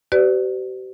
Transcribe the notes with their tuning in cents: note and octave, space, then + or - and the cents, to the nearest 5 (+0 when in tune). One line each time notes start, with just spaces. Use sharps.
G4 -40 B4 +40 D5 +0